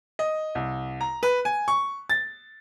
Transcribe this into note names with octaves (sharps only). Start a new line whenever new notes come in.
D#5
C2
A#5
B4
G#5
C#6
A6